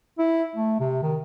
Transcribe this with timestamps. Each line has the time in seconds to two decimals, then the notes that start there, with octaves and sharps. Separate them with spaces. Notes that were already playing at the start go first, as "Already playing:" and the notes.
0.19 E4
0.56 A3
0.80 C3
1.03 D#3